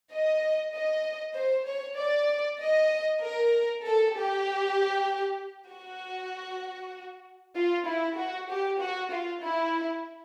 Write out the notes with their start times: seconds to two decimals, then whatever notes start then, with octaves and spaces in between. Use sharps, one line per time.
0.13 D#5
0.75 D#5
1.37 C5
1.68 C#5
1.99 D5
2.60 D#5
3.23 A#4
3.84 A4
4.15 G4
5.70 F#4
7.56 F4
7.87 E4
8.18 F#4
8.49 G4
8.80 F#4
9.11 F4
9.41 E4